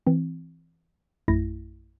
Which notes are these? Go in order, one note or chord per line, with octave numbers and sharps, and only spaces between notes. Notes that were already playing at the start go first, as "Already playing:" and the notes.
E3 C4
A#1 F#2 A3 E4 A#6